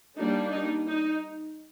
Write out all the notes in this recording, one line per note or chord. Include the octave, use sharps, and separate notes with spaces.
G3 A#3 D4 D#4
D#4
D#4